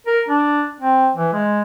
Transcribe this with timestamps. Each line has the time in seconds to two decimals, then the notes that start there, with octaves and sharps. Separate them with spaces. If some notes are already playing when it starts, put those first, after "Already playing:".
0.07 A#4
0.29 D4
0.81 C4
1.16 E3
1.33 G#3